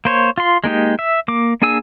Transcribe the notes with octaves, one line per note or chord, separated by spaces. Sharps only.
A#3 C5 C#5
F4 C6
G#3 A#3 D#4 G4
E5
A#3 D6
A#3 D4 G#4 G#5 E6